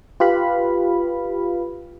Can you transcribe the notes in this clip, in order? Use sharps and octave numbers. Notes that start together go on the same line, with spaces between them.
F4 G4 B4 F5 B5